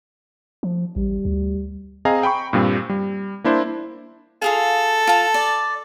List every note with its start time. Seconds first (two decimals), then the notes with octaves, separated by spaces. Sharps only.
0.63 F3
0.96 A1 G3
1.25 D2
2.05 C4 G#4 D#5 F5 G#5 A#5
2.23 G5 B5 C#6
2.53 G2 A#2 G3 C4
2.90 G3
3.44 A#3 D4 E4 C5
4.42 F4 G#4 A4 F5
5.07 F4 A5
5.34 D5